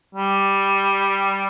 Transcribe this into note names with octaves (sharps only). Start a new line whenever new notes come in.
G3